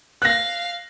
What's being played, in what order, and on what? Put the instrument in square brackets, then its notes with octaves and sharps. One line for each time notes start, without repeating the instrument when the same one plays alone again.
[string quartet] F5 [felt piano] F#6 A#6